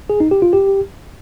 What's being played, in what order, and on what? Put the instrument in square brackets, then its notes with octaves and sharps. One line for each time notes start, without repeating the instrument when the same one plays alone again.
[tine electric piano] G#4
D#4
G4
F4
G4